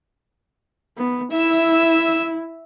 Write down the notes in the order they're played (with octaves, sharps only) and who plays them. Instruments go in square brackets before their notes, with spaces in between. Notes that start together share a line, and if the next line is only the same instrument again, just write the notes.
[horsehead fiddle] B3
[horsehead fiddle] E4 [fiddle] E5 E6